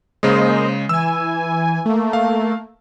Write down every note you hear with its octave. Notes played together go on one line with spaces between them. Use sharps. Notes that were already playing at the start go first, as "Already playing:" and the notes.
C#3 G#3 A#3 C5 D#5
E3 G#5 E6
A3 A#3
F5